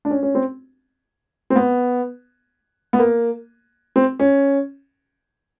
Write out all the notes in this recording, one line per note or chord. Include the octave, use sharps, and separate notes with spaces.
D4
C#4
C#4
C4
C4
B3
B3
A#3
C4
C#4